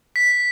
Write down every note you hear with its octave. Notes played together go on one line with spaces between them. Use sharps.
B6